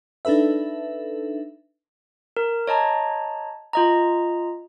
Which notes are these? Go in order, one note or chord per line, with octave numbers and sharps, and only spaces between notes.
D4 D#4 A4 B4 E5
A#4
C#5 D#5 A5 A#5
F4 D#5 A#5